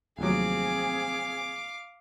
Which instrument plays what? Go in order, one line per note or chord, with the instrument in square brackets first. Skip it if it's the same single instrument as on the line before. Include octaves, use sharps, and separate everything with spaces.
[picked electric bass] F1 D#2 F#3 [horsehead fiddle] C4 G#4 [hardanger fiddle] F5 D6